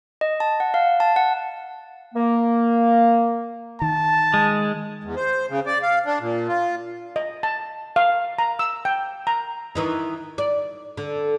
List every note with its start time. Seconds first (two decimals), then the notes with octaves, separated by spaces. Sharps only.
0.21 D#5
0.40 A5
0.60 F#5
0.74 F5
1.00 A5
1.16 F#5
2.14 A#3
3.82 D#3 A5
4.34 G#3
5.04 E2
5.16 C5
5.49 C#3
5.66 D5
5.83 F5
6.05 D4
6.20 A#2
6.48 F4
7.16 D#5
7.43 A5
7.96 F5
8.38 A#5
8.59 E6
8.85 G5
9.27 A#5
9.75 D#3 E3 D#4
10.38 D5
10.97 D3